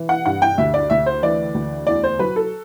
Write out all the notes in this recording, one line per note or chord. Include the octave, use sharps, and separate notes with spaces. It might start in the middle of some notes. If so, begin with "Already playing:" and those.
Already playing: E3
F#5
G2 F#5
G5
D2 E5
D5
D2 E5
C5
E3 D5
D2
E2 D5
C5
F#3 B4
A4